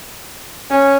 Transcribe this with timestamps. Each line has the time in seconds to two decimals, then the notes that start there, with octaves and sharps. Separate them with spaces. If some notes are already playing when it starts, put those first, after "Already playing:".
0.71 C#4